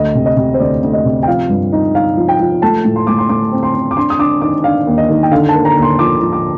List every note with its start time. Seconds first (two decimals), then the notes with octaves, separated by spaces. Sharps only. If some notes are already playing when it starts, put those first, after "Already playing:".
Already playing: D2 D#5
0.15 C3
0.26 D#5
0.37 C3
0.54 C5
0.60 D2 D5
0.83 D2
0.93 D#5
1.05 C3
1.23 G5
1.27 F3 F5
1.49 G2
1.72 D#4
1.95 D#4 F5
2.17 F3
2.29 G5
2.40 F3
2.62 A3 A5
2.85 A2
2.96 C6
3.07 A3 D6
3.18 C6
3.29 A2 D6
3.52 C4
3.63 C6
3.74 C4
3.91 D6
3.97 D4 C6
4.10 D#6
4.19 D4 D6
4.41 D#3 D6
4.64 D4 F5
4.87 D#2
4.98 D#5
5.10 D#3
5.23 G5
5.31 D3 F5
5.49 A5
5.54 A#3
5.65 A#5
5.77 D#2
5.82 C6
5.99 F3 D6
6.21 F3
6.32 D6